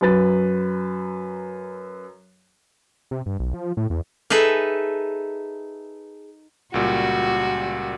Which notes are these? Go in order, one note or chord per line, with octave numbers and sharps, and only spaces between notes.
F#2 F#3 B4 A6
C3
G2
B1
F3
A2
E2
D#4 G#4 A4 B4 E5
C#2 A#2 G3 F#4